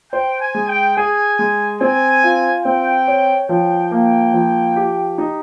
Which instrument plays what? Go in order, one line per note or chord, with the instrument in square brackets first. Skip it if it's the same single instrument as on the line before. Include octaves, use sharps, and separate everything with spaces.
[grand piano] C5 [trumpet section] G5
[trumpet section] G#5
[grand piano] G#3
[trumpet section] G5
[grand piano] G#4 [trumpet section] G#5
[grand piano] G#3
[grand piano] C4 [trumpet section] G#5
[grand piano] F4
[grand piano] C4 [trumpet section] G5
[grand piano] C#5
[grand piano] F3 [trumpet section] G5
[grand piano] A#3 [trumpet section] G5
[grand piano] F3
G4
D#4